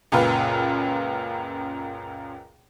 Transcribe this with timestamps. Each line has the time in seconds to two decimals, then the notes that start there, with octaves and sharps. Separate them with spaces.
0.12 C#2 F#2 A#2 F4 B4